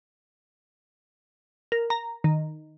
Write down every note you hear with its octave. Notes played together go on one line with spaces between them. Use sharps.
A#4
A#5
D#3